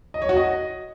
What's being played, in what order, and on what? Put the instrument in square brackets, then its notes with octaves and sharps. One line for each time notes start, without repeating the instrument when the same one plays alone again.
[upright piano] D#5
C#5
F#4
D#5